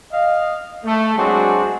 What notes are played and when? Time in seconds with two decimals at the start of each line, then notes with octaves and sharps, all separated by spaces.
0.12 D#5 F5
0.85 A3
1.17 F#3 G#3 C4 D4 F#4